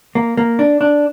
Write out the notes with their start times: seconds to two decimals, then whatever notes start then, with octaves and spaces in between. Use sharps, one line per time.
0.15 A#3
0.37 A#3
0.59 D4
0.81 D4